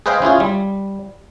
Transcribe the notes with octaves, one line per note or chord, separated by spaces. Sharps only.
G#4 B4 C5 D#5 F5 G5
C#4 E4 F4 G#4
G3